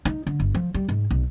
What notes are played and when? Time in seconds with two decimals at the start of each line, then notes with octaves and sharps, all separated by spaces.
0.05 D#4
0.27 D3
0.40 G1
0.55 F3
0.74 G3
0.89 G#2
1.11 B1